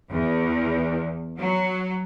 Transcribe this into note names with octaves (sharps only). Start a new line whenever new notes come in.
E2
F#3